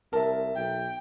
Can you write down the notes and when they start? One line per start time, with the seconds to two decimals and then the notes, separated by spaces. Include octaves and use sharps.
0.13 C2 A#4 E5 A5
0.55 B1 G5